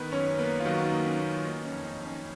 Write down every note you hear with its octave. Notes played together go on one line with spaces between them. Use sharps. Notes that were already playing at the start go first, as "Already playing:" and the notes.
Already playing: D#3 B3 B4
F#2 C#4 C#5
A#3 B3 B4
F4
D#3 F#3 F#4
D#4
A#3
C#4
A#3
F4
A#3 D#4
C#4
F2
D#4
F2
C#4